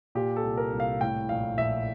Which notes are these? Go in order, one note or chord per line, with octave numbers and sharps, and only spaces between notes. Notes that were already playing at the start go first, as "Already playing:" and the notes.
A#2 G4
A4
C2
A#4
C2
F5
A2 G5
A#1 F5
A#1 E5